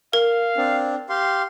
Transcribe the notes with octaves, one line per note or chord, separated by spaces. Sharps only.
A#4 F5
C4 D4
G4 F5 C6